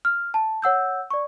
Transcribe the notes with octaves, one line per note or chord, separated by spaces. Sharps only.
F6
A5
C#5 F#5 E6 G6
D5 C#6